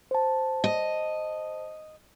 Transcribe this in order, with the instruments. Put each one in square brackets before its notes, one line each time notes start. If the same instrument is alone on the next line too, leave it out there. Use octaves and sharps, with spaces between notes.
[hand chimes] C5 A5
[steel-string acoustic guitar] D#5